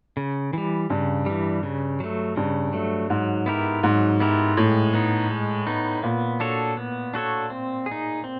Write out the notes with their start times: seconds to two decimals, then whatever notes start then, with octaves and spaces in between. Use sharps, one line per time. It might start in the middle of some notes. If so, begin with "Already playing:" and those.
0.17 C#3
0.53 E3 G3
0.90 G2 C#3
1.26 E3 G3
1.63 C#3
2.00 F#3 A3
2.36 G2 C#3
2.73 F#3 A3
3.10 G#2 F#3
3.46 B3 E4 G4 A#4
3.83 G#2 F#3
4.20 B3 E4 G4 A#4
4.57 A2 G#3
4.93 B3 D#4
5.30 G#3
5.67 B3 D#4
6.03 A#2 B3
6.40 D4 F#4 A4 C#5
6.77 B3
7.14 D4 F#4 A4 C#5
7.50 C4
7.86 G#4
7.91 D#4
8.24 C4